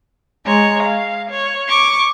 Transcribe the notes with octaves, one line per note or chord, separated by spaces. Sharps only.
G#3 C#5 A#5
F5
C#5
C#6 D6